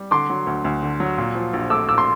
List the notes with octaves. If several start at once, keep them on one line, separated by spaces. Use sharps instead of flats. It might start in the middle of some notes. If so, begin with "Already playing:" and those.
Already playing: G3
D3 C6 D6
F#3
D2
D2
D3
F#3
A#2
F3
A#1
A3 D6 E6
A#2 D6 E6
C6